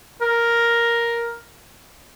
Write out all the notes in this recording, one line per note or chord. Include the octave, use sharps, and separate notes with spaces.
A#4